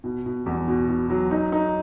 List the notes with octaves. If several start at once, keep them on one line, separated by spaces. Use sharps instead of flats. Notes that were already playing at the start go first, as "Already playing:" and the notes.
B2
B2
E2
B2
B2
F#3
D#4
D#4